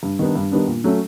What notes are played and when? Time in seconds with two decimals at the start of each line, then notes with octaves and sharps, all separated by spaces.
0.03 G2
0.19 D#3 G3 B3 D4
0.36 G2
0.52 D#3 G3 B3 D4
0.68 A#2
0.84 F#3 A3 C#4